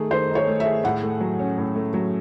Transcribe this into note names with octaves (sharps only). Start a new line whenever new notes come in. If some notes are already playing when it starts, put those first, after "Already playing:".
Already playing: D#3 A3 D#4 G#4
D#3 C5
D#4
C#5
A3
E5
G#4
A2 F#5
A3
F#3
C#4
A2
A3
F#3